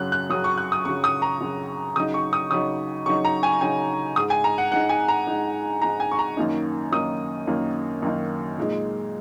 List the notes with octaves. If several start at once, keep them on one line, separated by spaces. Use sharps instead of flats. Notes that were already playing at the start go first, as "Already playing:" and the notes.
Already playing: F#2 C#3 F#3 F#6
F#6
F#2 C#3 F#3 D#6
C#6
F#6
D#6
F#2 C#3 F#3 C#6
D#6
A#5
F#2 C#3 F#3
C#3 F#3 D#4 D#6
C#6
D#6
C#3 F#3 D#4 D#6
C#3 F#3 D#4 C#6
A#5
G#5
C#3 F#3 D#4 G#5
G#2 G#3 D#4 D#6
G#5
A#5
F#5
G#2 G#3 D#4 F#5
G#5
A#5
G#2 G#3 D#4
G#2 G#3 D#4 A#5
G#5
C#6
A#5
F#2 D#3 A#3 D#4
F#2 D#3 A#3 D#4 D#6
F#2 D#3 A#3 D#4
F#2 D#3 A#3 D#4
A#2 G#3 D#4